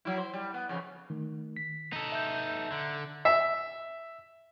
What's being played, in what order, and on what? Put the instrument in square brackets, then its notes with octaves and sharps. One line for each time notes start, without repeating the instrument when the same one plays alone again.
[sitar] F#3 E4
C5
G3
B3
F2 C#3 E3
[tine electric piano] D#3 A3
B6
[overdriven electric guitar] D#4 A4
[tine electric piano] E5 G6
[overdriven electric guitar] D3
[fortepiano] E5